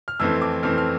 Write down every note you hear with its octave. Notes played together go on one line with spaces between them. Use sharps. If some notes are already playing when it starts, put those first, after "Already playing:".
F6
F2 E3 A3 C4 E6
D6
F2 E3 A3 C4 F6
F6